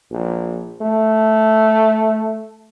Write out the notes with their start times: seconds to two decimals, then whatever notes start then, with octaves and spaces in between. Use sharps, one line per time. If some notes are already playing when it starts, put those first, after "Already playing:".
0.11 A#1
0.81 A3